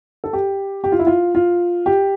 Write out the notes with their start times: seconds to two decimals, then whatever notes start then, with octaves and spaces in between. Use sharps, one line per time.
0.24 A4
0.33 G4
0.84 G4
0.92 F4
0.99 E4
1.07 F4
1.35 F4
1.86 G4